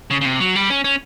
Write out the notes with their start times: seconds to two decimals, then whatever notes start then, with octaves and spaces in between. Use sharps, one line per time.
0.10 C#3
0.21 C#3
0.25 C3
0.40 F#3
0.55 G3
0.70 C#4
0.84 C#4